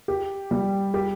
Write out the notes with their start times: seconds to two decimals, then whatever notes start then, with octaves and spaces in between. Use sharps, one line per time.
0.08 G4
0.51 G3
0.94 G4